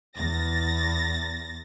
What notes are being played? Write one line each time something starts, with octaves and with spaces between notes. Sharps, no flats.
E2 A6 A#6